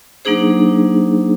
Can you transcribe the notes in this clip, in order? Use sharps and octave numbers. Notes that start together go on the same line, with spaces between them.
F#3 A#3 D4 D#4 G#4 C5